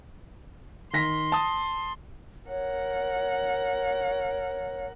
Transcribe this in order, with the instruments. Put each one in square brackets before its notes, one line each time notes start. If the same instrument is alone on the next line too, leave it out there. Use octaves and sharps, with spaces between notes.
[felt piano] D#3 A#6 B6 [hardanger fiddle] C6
[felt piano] A5 D#6
[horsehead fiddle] A#4 F#5 [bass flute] C#5